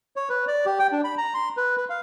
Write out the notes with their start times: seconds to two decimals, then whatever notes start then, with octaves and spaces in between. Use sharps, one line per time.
0.16 C#5
0.29 B4
0.47 D5
0.66 G4
0.79 G5
0.92 D4
1.04 B5
1.18 A#5
1.34 C6
1.57 B4
1.77 B4
1.90 F5